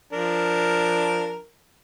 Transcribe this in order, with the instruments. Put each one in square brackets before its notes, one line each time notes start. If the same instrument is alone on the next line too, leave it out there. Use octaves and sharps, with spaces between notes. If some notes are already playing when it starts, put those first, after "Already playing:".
[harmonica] F3 D4 A#4